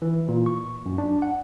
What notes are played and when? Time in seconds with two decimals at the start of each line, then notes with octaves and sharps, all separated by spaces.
0.02 E3
0.28 A#2
0.46 C#6
0.86 F#2
0.98 D4
1.22 F#5